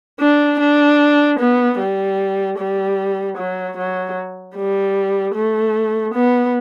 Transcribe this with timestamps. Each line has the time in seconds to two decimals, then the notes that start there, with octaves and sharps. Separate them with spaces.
0.20 D4
0.59 D4
1.39 B3
1.78 G3
2.58 G3
3.37 F#3
3.77 F#3
4.56 G3
5.35 A3
6.14 B3